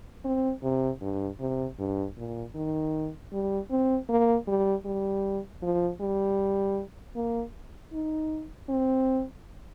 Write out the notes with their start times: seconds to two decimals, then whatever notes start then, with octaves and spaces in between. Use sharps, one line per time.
0.25 C4
0.63 C3
1.01 G2
1.40 C3
1.79 G2
2.17 A#2
2.55 D#3
3.32 G3
3.70 C4
4.09 A#3
4.48 G3
4.85 G3
5.62 F3
6.01 G3
7.16 A#3
7.93 D#4
8.69 C4